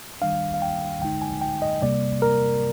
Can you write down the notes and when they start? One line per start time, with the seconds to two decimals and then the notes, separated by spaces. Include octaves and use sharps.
0.21 D#3 G3 D4 F5
0.54 F5
0.62 G5
1.02 D3 G#3 D#4 G5
1.22 G#5
1.42 G5
1.62 D#5
1.82 C3 G3 A#3 D5
2.22 A#4